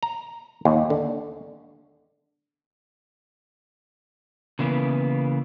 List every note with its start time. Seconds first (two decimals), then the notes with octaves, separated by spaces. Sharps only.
0.03 A#5
0.65 D#2
0.90 D3
4.59 C#3 E3 A#3 B3